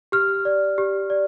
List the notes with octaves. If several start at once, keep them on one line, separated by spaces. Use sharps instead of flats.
G4 F6
D5
G4
D5